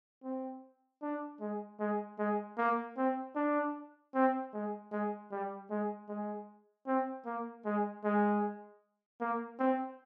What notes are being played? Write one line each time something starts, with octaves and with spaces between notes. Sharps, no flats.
C4
D4
G#3
G#3
G#3
A#3
C4
D4
C4
G#3
G#3
G3
G#3
G#3
C4
A#3
G#3
G#3
A#3
C4